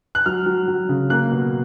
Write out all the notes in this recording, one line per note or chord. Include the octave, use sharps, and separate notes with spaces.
F#6
F#3 F6
F#3
F#3
C#3
A#3 F#6
B2